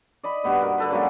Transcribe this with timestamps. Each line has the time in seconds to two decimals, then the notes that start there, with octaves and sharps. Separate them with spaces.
0.23 D5 D#5 B5
0.44 G2 B2 B3 B4
0.61 A#4
0.78 D3 A4 B4
0.91 C#3 F#3 G#3 A#3